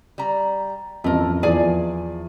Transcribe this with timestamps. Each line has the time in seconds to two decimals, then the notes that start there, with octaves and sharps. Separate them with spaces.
0.18 G3 A#5
1.04 A1 F2 A3 A#4
1.43 E2 F3 G#4 D5 G#5